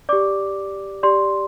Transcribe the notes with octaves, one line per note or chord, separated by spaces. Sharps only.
G4 D5 D6
G4 D5 C6